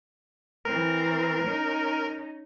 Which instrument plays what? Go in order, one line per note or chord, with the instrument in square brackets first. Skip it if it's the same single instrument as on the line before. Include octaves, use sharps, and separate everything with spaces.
[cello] E3 C4 [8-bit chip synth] A#4
[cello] C#4 D#4